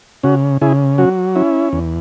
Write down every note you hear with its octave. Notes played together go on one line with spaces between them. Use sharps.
C#3 C#4 F#4
C#3 E4 G#4
F#3 C#4 F#4
C#4 E4
E2